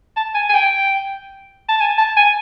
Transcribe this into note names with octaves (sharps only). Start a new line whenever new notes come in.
A5
G#5
G#5
G5
A5
G#5
A5
G#5